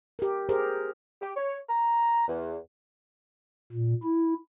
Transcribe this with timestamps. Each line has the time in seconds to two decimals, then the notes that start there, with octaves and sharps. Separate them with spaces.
0.19 G4 A#4
0.49 G4 G#4 A#4 C5
1.22 G4
1.37 C#5
1.69 A#5
2.28 E2
3.72 A#2
4.03 E4